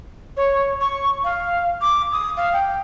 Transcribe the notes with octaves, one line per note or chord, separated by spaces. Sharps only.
C#5
C#6
F5
D6
D#6
F5
G5